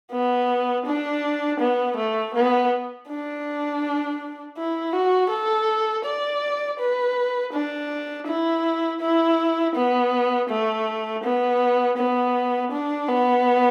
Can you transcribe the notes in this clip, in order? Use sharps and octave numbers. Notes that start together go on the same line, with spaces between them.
B3
D4
B3
A3
B3
D4
E4
F#4
A4
D5
B4
D4
E4
E4
B3
A3
B3
B3
D4
B3